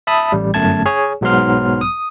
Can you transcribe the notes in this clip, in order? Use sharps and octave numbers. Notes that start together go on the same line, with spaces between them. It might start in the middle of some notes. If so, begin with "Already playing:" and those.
E5 A5 B5 D#6
A1 G3
G1 F#2 A3 A5 G#6
G#4 C#5 G#5
B1 G#2 F#3 B3 C6 F6
D#6